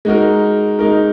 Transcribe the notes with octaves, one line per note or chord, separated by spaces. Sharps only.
G#3 D#4 F#4 A#4
G#3 D#4 F#4 A#4